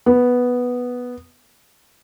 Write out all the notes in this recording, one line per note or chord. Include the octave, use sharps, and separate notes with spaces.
B3